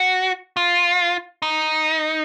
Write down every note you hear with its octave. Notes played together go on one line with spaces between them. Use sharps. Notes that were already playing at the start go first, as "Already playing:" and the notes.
Already playing: F#4
F4
D#4